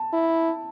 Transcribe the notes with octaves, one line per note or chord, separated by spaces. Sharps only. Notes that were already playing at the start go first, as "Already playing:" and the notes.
Already playing: A5
E4